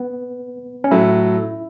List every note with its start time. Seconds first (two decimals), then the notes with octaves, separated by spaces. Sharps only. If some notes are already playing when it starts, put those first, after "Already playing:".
Already playing: B3
0.84 C#4
0.91 A2 F#3 A3 E4